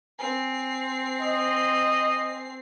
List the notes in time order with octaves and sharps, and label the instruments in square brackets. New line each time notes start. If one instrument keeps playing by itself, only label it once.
[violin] C4 C7 [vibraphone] G#5
[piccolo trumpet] D#5